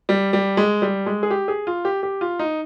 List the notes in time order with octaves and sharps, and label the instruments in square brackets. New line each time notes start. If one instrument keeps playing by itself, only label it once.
[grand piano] G3
G3
G#3
G3
G#3
G#4
G4
G#4
F4
G4
G4
F4
D#4